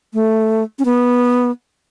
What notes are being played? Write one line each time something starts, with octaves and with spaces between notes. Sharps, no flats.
A3
C#4
B3